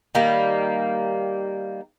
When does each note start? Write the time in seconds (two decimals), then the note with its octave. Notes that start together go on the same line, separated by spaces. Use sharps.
0.15 D#3 G3 A#3